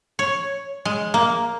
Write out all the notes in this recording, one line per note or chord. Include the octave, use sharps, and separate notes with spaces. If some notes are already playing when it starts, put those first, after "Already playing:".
C#5
G#3
A#3